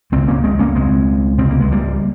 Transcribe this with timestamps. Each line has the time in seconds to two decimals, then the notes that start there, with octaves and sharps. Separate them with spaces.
0.12 C#2 C#3 G#3 C4
0.28 A#3 C#4
0.44 G#3 C4
0.59 A#3 C#4
0.75 C#2 C#3 G#3 C4
1.38 C#2 C3 C4
1.50 A#3
1.61 G#3
1.71 G3 A#3